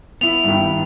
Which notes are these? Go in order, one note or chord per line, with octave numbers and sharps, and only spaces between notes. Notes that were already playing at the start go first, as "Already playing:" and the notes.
B3 E4 F7
G2 D#3